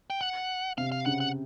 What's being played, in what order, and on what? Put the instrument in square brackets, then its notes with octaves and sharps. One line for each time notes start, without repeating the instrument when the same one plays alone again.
[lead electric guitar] G5
F#5
[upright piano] C3 [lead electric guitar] F5
[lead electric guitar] F5
[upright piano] C#3 [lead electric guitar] F#5
[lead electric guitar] F#5